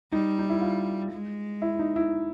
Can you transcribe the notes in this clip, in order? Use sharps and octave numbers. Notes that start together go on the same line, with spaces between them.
G3 D#4
D#4
E4
F4
G#3
E4
D#4
E4